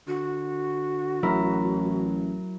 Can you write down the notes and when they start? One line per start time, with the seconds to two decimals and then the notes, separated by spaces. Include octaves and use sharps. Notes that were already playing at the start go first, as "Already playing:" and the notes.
0.08 D3 F#4
1.23 A1 F#3 E4 A#4